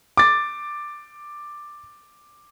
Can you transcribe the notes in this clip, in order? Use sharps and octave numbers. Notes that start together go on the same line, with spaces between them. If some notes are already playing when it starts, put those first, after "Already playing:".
D6 A6